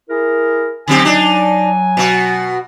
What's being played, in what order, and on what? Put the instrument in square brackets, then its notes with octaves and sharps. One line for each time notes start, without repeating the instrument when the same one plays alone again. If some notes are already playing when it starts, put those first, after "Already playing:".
[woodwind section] E4 G#4 A#4
[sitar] D3 C4 G4 [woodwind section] F#3 G#5
[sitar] D4 D#4
B2 F#4